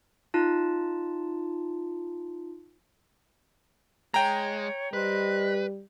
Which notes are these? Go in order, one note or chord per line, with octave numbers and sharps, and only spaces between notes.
D#4 F4 A5
G#3 C#5 G5 A#5
G3 B4 C5 D#5 F#6